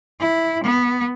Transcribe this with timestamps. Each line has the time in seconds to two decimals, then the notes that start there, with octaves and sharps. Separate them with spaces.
0.19 E4
0.64 B3